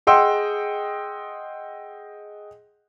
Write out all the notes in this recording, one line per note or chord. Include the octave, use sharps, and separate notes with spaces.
G#4 D#5 F#5 G5 C6 E6